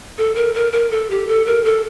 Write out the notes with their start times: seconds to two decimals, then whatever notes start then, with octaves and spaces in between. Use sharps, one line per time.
0.18 A4
0.35 A#4
0.55 A#4
0.72 A#4
0.91 A4
1.10 G4
1.28 A4
1.46 A#4
1.65 A4